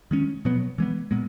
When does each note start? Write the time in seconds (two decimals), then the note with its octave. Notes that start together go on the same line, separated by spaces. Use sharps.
0.11 D#3 G#3 C#4
0.45 B2 F#3 B3
0.78 E3 G#3 B3
1.11 A#2 G#3 B3